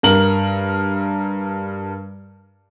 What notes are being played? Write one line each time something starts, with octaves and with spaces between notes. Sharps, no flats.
G2 A#4 F#7